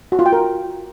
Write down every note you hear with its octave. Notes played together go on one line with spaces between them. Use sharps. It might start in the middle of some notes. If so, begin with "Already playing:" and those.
F#4
F4
G5
A#4